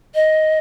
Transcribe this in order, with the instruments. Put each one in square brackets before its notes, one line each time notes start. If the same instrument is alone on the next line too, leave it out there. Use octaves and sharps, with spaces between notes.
[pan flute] D#5